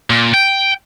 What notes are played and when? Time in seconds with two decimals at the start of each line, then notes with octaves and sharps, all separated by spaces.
0.10 A#2
0.34 G5